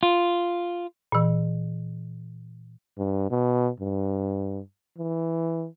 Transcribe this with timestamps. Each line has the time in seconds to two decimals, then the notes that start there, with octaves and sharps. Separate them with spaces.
0.03 F4
1.12 A#2 E3
2.98 G2
3.31 B2
3.80 G2
4.98 E3